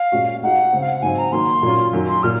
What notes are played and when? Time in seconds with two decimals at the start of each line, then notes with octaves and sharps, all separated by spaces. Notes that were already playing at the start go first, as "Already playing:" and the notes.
Already playing: F5
0.12 A#2 G#3 C#4 F#4
0.42 G#3 D#4 F#4 F#5
0.73 C#3 G#3 C4
0.82 F5
0.93 F#5
1.02 G#2 F#3 C4 G#5
1.18 A#5
1.32 D#3 F#3 A#3 C6
1.63 A#2 F#3 C#4 F4
1.93 F#2 D#3 F#3
2.09 C6
2.23 A#2 F6